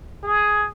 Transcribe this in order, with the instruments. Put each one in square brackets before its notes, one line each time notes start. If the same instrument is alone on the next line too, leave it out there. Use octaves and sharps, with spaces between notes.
[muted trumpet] G#4